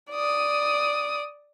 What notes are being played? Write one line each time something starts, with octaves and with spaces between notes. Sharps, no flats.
D5 D#6